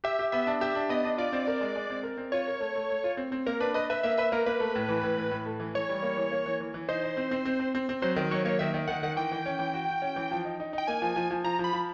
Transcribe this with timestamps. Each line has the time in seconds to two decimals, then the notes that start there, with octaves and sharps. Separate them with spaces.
0.04 G4 E5
0.19 G4
0.32 B3 E5
0.47 D4
0.61 G4 E5
0.75 D4
0.89 B3 D#5
1.04 D4
1.18 F4 D5
1.33 C4
1.47 A#4
1.61 G#3
1.76 G#3
1.90 C4
2.03 A#4
2.18 C4
2.32 F4 C#5
2.47 A#4
2.61 A3
2.76 A3
2.90 A3
3.04 F4
3.17 C4
3.32 C4
3.46 A#3 A#4
3.60 D4 B4
3.74 B4 D#5
3.90 B4 E5
4.03 A#3 E5
4.17 B4 E5
4.32 A#3 A#4
4.46 A#3 B4
4.60 A3
4.75 A2
4.89 E3
5.03 A2
5.17 A2
5.31 A2
5.46 A3
5.60 E3
5.74 E3 C#5
5.89 G3
6.03 A#3
6.17 E3
6.32 A#3
6.46 E3
6.60 E3
6.74 E3
6.89 D#4 C5
7.03 D#4
7.17 C4
7.31 C4
7.45 C4
7.60 C4
7.75 C4
7.89 C4
8.02 F#3 C5
8.16 D#3
8.31 F#3 C#5
8.45 A#3 C#5
8.59 D#3 E5
8.74 D#3
8.88 D#3 F#5
9.03 D#3 F#5
9.16 E3 G5
9.31 E3
9.46 C#4
9.59 E3
9.74 F#4
9.88 F#4
10.02 C#4
10.16 E3
10.31 F3
10.45 D#4
10.60 D#4
10.73 D#4 G5
10.87 A#3 G#5
11.02 F3
11.16 F3
11.31 F3
11.44 F3 A#5
11.59 F3 B5
11.73 F3